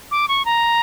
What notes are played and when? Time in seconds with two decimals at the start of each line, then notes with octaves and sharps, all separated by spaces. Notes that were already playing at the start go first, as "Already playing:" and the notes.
0.11 D6
0.28 C#6
0.45 A#5